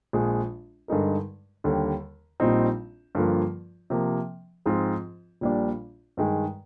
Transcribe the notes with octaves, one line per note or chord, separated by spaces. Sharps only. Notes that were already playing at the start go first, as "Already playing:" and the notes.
A#1 A#2 G#3
G2 D3 G#3 D#4 A#4
D#2 D3 G3
A#1 A#2 G3 C4 D#4
G2 D3 F3 A#3 F4
C3 F3 A#3
G#2 F3 C4 F4 G#4
A#1 A#2 G3 D4
G2 D#3 G#3